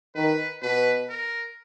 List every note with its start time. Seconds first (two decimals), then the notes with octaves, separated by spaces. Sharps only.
0.15 D#3 B4
0.62 B2 B4
1.09 A#4